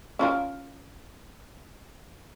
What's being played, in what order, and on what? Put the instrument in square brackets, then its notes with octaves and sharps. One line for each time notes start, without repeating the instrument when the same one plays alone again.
[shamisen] C#4 F4 A#4